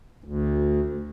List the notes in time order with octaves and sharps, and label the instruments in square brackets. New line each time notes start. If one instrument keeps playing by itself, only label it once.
[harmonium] D2